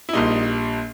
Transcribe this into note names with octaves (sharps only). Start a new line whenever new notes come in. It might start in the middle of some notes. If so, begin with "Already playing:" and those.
E4
A#1 A#2 G3 D#4